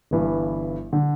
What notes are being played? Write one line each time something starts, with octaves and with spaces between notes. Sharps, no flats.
G1 G2 E3
D3